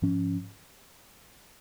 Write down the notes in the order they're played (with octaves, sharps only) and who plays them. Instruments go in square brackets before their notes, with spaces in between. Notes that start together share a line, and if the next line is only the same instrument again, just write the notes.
[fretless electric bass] G#2 F3 C#4